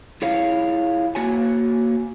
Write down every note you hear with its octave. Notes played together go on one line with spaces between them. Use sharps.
E4 F4 G#4 C#5 F5
A#3 F#4 C#5 G#5